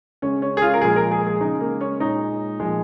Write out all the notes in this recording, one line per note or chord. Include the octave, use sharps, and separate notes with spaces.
C#3 G#3 C#4
C#4
G#4
F4
A#4
A#2 F3 G#3 G#4
A#4
G#4
G#4
C#3 G#3 D#4
A#3
C#4
A#2 G#3 D#4
A#2 F3 G#3